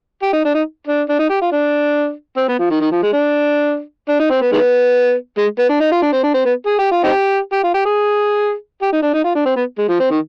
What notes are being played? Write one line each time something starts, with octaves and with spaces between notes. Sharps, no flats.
G4
D#4
D4
D#4
D4
D4
D#4
G4
F4
D4
C4
B3
F3
D#3
D#3
F3
G#3
D4
D4
D#4
C4
B3
D#3 G#3 B3
G#3
B3
D4
D#4
F4
D4
C4
D4
C4
B3
G#4
G4
F4
C4 D#4 G4
G4
F4
G4
G#4
G4
D#4
D4
D#4
F4
D4
C4
B3
G#3
F3
C4
D#3